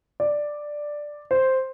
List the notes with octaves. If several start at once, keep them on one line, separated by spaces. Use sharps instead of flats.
D5
C5